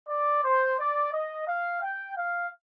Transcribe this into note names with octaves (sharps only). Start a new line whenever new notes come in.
D5
C5
D5
D#5
F5
G5
F5